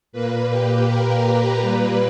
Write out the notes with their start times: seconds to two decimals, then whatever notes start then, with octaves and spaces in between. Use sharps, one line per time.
0.13 A#2 A#3 B4
0.49 G4
0.86 A#4
1.24 B4
1.59 A#2 G3 A#3